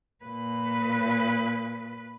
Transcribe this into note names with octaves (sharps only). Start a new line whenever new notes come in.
A#2 B4